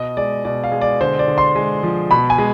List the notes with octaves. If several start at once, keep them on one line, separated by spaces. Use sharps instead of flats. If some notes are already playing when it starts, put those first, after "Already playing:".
Already playing: B2 D#5
G#3 D5
B2 D5
F5
G#3
D5
D3 C5
D5
D3
C6
G#3
F3
B2 B5
G#5
G#3